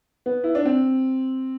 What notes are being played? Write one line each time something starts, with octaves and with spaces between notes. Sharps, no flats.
B3
E4
D4
C4